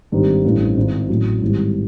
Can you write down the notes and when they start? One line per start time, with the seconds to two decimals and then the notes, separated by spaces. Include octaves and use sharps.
0.12 G#1 G2 D#3 G3 C4
0.44 A1 G2 E3 A3 C4
0.77 G#1 G#2 E3
1.09 A1 A2 F#3
1.41 G#1 G#2 E3 G3